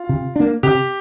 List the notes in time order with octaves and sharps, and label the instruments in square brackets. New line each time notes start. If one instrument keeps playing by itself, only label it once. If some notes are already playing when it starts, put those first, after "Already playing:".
Already playing: [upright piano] F4
[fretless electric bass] C3
A#3 D4
[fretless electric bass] C3 [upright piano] G4